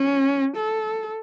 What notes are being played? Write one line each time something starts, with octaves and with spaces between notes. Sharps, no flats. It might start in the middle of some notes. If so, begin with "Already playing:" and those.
Already playing: C#4
A4